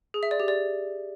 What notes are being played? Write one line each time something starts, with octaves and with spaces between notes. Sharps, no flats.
G#4
E5
D5
G4
D5